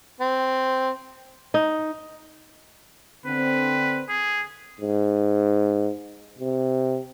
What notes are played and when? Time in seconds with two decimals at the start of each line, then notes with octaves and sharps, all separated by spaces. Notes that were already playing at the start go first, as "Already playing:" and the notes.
0.20 C4
1.54 D#4
3.26 D3 C4 B4
4.09 G#4
4.81 G#2
6.39 C3